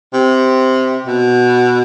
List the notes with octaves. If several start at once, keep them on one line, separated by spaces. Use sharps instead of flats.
C3
B2